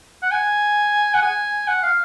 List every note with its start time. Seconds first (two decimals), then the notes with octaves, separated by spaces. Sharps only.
0.23 F#5
0.32 G#5
1.14 F#5
1.22 G#5
1.68 F#5
1.83 F5